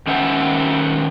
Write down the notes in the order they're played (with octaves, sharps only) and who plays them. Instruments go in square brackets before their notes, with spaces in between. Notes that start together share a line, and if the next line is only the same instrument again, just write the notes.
[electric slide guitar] D#3 C#4 C5 E5 F#5